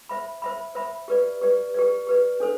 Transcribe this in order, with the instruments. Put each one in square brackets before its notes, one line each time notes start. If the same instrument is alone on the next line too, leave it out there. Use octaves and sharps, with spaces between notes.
[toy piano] C5 E5 B5
C5 E5 B5
C5 E5 B5
G4 B4 D5
G4 B4 D5
G4 B4 D5
G4 B4 D5
D4 A4 C5